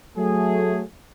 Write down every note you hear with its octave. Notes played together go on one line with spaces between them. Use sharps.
F#3 A3 G#4